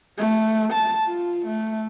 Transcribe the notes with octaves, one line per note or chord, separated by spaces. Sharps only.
A3
A5
F4
A3